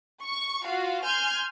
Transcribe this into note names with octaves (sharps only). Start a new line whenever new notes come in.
C#6
F4 F#4 F5
G#5 C6 F6 G6 G#6